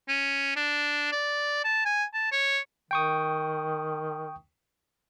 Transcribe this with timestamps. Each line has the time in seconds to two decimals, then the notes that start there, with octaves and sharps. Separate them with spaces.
0.08 C#4
0.56 D4
1.12 D5
1.64 A5
1.85 G#5
2.14 A5
2.32 C#5
2.91 D#3 G5 C#6 D#6